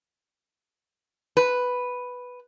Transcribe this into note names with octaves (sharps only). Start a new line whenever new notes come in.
B4